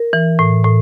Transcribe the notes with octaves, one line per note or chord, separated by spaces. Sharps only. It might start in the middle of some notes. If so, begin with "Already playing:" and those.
Already playing: A#4
E3
A2
A2